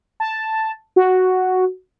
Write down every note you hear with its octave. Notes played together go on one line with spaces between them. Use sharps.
A5
F#4